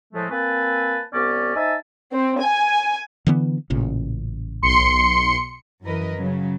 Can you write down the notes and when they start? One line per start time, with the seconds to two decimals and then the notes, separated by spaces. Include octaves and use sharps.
0.13 A2 F3 G#3 A3
0.31 A#3 C4 B4 G#5 A5
1.13 C2 B3 C#4 D5
1.56 D#4 C5 E5 G#5 A5
2.13 C4
2.43 G#5
3.27 D3 E3 B3
3.70 A1 A#2 C#3
4.62 B1 C6 C#7
5.83 F#2 E3 A#4 B4 D#5
6.17 C#3 F#3